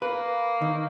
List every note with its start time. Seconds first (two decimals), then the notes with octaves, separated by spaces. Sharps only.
0.02 A#3 B4
0.62 D#3